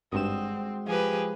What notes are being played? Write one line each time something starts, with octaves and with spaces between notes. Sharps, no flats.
G#1 G2 G#3 C4 F#4 D#6 E7
F3 G4 G#4 B4